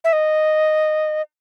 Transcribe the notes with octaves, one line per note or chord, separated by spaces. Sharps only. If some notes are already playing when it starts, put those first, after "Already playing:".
E5
D#5